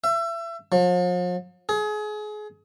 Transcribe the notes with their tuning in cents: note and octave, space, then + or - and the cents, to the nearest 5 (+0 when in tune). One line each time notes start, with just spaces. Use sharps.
E5 +30
F3 +40
G#4 +30